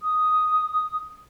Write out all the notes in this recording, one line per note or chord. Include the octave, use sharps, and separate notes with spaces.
D#6